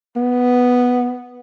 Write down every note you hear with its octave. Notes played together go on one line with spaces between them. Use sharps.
B3